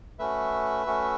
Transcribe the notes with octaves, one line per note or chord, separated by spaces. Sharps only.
A3 C#4 F#4 B4 E5
A3 C#4 F#4